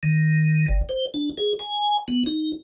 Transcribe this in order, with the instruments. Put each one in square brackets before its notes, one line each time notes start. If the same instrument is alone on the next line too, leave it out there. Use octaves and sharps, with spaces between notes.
[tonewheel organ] D#3
G1
C5
D4
G#4
G#5
B3
D#4